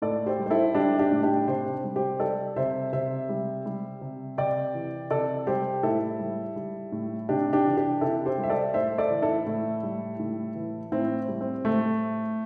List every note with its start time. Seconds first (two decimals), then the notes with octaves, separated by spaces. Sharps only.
0.02 A2 A4 D5
0.26 G4 C5
0.38 G3
0.46 C5
0.50 E4 A4
0.75 G3 D4 G4
0.99 D4 G4
1.11 A2
1.23 D4 G4
1.47 C3 G4 C5
1.84 G3
1.96 G4 C5
2.20 G3 A4 D5
2.56 C3 C5 E5
2.93 C3 C5 E5
3.29 G3
3.66 G3
4.01 C3
4.38 C3 D5 G5
4.74 E3
5.11 C3 A4 D5
5.47 G3 G4 C5
5.83 A2 E4 A4
6.19 G3
6.56 G3
6.92 A2
7.29 C3 D4 G4
7.53 D4 G4
7.65 E3
7.77 D4 G4
8.01 C3 E4 A4
8.26 G4 C5
8.38 G3
8.43 E5
8.49 A4 D5
8.74 A2 C5 E5
8.98 A4 D5
9.10 E3
9.22 E4 A4
9.46 A2
9.83 G3
10.19 A2
10.55 E3
10.92 A2 C4 E4
11.28 G3
11.41 C4
11.65 A2 A3